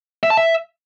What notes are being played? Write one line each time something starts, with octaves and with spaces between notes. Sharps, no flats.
E5
A5
E5